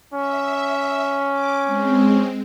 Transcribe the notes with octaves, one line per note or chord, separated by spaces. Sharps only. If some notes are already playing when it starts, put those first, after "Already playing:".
C#4 E5
D6
G#3 C4